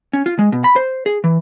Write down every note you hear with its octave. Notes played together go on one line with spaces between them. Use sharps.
C#4
F4
G#3
B2
B5
C5
G#4
E3